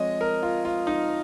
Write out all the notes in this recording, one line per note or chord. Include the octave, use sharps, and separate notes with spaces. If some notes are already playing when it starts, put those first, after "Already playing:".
Already playing: F3 G#3 C4 C#5 D#5
A#4
F4
F4
D#4